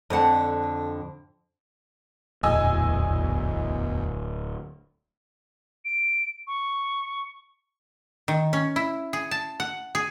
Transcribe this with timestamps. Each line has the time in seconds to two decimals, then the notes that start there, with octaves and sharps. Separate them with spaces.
0.10 F2 D3 F#5 A5
2.43 D1 A#1 E2 D#5 G#5 E6
5.85 D7
6.47 C#6
8.28 D#3
8.53 C#4
8.76 E4
9.13 G#4
9.31 A5
9.60 F#5
9.95 G#4